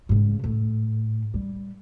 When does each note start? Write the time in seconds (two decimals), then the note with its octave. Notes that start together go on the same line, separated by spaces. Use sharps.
0.09 G#2 C#3
0.44 A2
1.34 G3